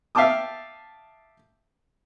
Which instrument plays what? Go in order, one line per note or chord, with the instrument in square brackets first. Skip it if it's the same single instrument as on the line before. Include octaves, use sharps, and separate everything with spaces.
[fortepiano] E5 F5 G5 A5 D6 D#6